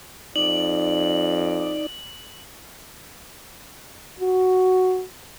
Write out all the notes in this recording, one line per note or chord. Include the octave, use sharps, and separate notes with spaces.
F2 D#4 D5 F#7
F#4